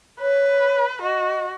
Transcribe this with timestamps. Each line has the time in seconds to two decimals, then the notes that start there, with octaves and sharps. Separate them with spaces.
0.20 B4 C#5
1.02 F#4 D#5